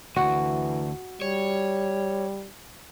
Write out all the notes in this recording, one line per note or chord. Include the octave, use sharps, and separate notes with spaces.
D2 E3 F#4
G3 C#5